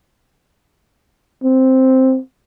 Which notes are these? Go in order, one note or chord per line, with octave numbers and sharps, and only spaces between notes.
C4